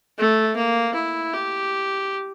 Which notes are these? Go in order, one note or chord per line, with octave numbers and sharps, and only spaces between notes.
A3
A#3
E4
G4